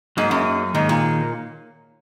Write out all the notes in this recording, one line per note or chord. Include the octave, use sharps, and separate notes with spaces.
G#2 F#3 A#3 D#4 G#4
F#2
G#2 D#3 A#3 D#4 G#4
A#2